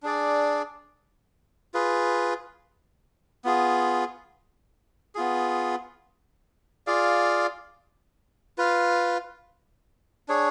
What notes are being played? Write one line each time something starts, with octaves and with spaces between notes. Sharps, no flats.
D4 G#4 D5
F4 G#4 B4
B3 F4 G#4
B3 F4 G#4
F4 G#4 D5 F5
F4 B4 F5
D4 G#4 C#5